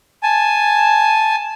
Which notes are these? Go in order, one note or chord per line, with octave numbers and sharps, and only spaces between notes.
G#5 A5